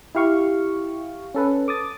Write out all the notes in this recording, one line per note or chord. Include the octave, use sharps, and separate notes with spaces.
E4 G4 F5 C#6
C#4 A4 B4
D6 D#6 A6